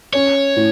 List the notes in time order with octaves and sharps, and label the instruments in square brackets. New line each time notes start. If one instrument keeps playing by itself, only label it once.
[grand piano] C#4 [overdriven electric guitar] C#5
[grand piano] A2